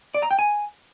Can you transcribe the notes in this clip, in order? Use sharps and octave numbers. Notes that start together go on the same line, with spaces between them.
D5
A#5
G5
G#5